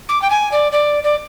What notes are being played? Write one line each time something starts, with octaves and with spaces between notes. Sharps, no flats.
D6
G5
G#5
D5
D5
D5